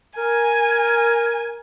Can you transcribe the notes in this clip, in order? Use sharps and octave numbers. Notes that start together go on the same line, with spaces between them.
A#4 G#5